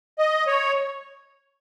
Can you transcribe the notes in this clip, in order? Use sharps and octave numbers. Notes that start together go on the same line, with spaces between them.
D#5
C#5